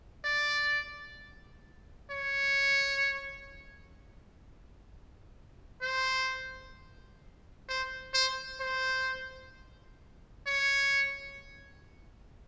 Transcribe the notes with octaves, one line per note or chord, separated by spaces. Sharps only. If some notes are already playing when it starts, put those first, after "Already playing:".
D5
C#5
C5
C5
C5
C5
C#5